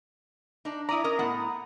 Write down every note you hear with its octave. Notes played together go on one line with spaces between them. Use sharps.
D4 D#4
E4 D5 A#5 D#6
C#4 A#4 D#5
A2 B3 F#5